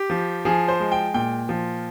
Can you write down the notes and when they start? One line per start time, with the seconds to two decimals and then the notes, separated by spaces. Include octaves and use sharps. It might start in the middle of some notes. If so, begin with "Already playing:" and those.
Already playing: G4
0.10 F3
0.45 F3 G#4
0.68 C5
0.80 G#3
0.92 G5
1.14 A#2 G5
1.49 F3